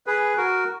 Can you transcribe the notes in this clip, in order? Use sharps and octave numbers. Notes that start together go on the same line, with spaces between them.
G#4 B4
F#4 A#4